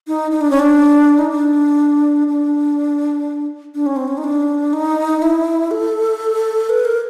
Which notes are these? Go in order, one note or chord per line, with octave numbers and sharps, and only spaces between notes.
D#4
D#4
D4
C#4
D4
D#4
D4
D4
D4
C#4
C4
C#4
D#4
D4
D#4
E4
A4
B4
A#4